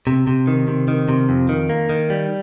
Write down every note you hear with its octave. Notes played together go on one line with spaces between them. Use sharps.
C3
C3
D#3
C3
D#3
C3
F2
D#3
A#3
D#3
G3